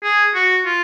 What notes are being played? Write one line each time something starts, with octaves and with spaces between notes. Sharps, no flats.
G#4
F#4
F4